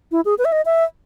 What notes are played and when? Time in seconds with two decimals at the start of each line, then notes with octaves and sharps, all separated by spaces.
0.12 E4
0.25 G#4
0.38 B4
0.45 E5
0.52 D#5
0.65 E5